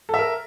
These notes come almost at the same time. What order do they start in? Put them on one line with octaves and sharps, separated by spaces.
A4 E5 A#4